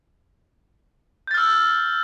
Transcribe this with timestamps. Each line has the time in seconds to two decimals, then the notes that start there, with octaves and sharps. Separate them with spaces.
1.27 G6
1.31 A6
1.34 F6
1.38 E6